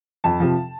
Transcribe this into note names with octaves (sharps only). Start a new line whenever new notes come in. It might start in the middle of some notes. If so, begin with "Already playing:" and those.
F2 A5
C3 F3